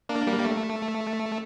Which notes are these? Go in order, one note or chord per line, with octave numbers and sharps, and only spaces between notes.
A#3 D4
G3 A#3
G3
A3